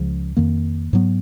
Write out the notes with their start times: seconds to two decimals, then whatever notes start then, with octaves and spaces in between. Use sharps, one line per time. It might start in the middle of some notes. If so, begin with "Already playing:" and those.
Already playing: C#2 C#3 F3
0.37 F2 D#3 A#3
0.93 G#2 F#3 B3